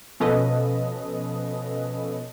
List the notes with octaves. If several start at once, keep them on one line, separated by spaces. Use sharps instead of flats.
B2 F3 C#4 A4 B4 D#5